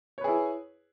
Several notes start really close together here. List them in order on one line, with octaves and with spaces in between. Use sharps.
C#5 B4 G#4 E4